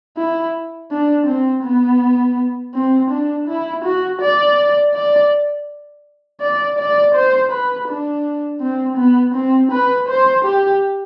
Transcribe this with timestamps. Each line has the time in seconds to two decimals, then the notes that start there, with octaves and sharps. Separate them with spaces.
0.17 E4
0.91 D4
1.26 C4
1.63 B3
2.74 C4
3.10 D4
3.48 E4
3.84 F#4
4.21 D5
4.94 D5
6.40 D5
6.78 D5
7.14 C5
7.51 B4
7.88 D4
8.61 C4
8.97 B3
9.34 C4
9.72 B4
10.08 C5
10.45 G4